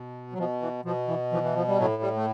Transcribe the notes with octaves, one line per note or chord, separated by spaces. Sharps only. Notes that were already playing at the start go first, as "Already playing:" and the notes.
Already playing: B2
F#3
B2 F3
E3
B2 F3
E3
E3 F3
E3
F3
G3
A2 F#3
G3
A3